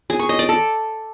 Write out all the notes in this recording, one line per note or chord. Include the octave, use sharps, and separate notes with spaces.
G#4
C#6
D#5
D5
A4